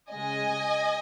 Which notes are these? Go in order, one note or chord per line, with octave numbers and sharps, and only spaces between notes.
C#3 G#3 D#5 G#5